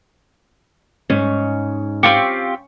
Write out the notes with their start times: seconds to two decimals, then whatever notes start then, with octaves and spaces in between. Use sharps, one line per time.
1.10 G#2 C#4
2.03 C4 F4 G4 C#6